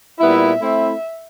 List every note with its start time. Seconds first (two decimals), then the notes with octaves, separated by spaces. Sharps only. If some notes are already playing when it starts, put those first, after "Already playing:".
0.20 A#2 G3 B3 E4 E5
0.60 A3 C4 E4